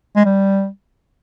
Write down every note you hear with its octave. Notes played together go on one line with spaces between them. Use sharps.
G#3
G3